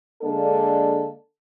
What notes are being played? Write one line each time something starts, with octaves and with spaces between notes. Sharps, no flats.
D3 G#3 A#3 D4 A4